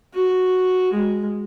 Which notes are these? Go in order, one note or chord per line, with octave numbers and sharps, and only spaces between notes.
F#4
G#3